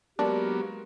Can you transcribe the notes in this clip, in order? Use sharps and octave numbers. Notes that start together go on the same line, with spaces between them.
F#3 G#3 A#3 B3 D4 F#4 G4 A#4